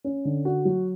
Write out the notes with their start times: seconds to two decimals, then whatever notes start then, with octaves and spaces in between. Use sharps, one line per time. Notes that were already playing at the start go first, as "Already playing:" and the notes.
0.04 C#4
0.25 D3
0.45 F#4
0.65 F#3